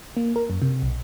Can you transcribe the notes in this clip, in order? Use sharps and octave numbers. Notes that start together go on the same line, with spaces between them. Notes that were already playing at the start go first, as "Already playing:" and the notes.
A#3
A#4
F#2
C3
B1